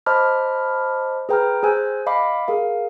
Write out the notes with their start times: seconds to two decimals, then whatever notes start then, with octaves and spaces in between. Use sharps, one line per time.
0.06 C5 D#5 A5 B5 D6 F6
1.29 G#4 B4 G5 A#5 D#6 F6
1.63 G#4 C5 G#5 E6 F#6 G6
2.06 D#5 F5 B5 D6
2.48 G#4 A#4 F5